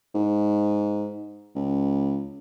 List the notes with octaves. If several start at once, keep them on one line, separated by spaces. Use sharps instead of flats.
G#2
C#2